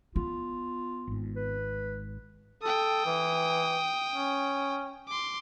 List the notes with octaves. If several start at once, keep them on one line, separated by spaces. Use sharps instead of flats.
B3 F4
G#1 G#2
B4
A4 G5 D#6
E3
C#4
C6 D6